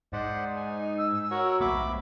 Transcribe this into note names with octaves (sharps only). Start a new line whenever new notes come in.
G#2 D#4 C5 D5 F#5
G#5
E6
F#4 A#4 C#5
B1 A3 A#3 E5 B5 D6